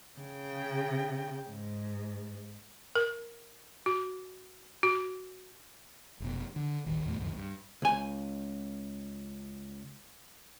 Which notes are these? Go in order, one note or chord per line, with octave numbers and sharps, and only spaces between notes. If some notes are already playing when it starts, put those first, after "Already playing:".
C#3 G5
G#2
A#4
F#4
F#4
F1 B2
D3
D#1 A1 D#3
E2 A#2 F#3 A3
C2 F#2 A2 D#3
G2
C#2 G#5